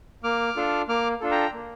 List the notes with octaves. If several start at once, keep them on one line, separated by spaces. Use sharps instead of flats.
A#3 D6 F6
D4 F4 A4
A#3 D6 F6
D4 F4 A4
G5 A#5
A#3